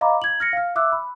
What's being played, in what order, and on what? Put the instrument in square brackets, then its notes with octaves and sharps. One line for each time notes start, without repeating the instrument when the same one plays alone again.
[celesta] D#5 F5 A#5 B5 D6
G#6 F#7
F6 A#6 C#7
F5 F6
E5 D6 E6 F#6
B5